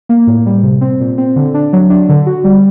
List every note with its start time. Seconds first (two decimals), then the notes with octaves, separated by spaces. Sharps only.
0.09 A#3
0.27 A2
0.46 G3
0.63 C3
0.81 C4
1.00 A#2
1.18 C4
1.36 D3
1.54 D4
1.73 F#3
1.90 D4
2.09 D3
2.26 F#4
2.44 G3